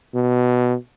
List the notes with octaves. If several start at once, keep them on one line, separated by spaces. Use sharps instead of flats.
B2